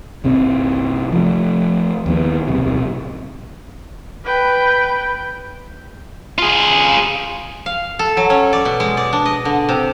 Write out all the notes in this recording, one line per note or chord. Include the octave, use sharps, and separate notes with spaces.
G1 C2 C3 C4
F3 A3
D#2 A#3 B3
D1 B1 C3
B4 G5
F4 G#4
F5
A4
F#3
C#4
D5
B2
G#3
D5
D4
D#5
D3
C3